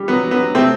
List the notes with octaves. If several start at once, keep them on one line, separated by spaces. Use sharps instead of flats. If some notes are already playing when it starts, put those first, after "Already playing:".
Already playing: G3
F#3 B3
F#3
B3
F#3
C3 A3 C4